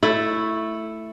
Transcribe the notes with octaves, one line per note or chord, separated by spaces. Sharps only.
A3 E4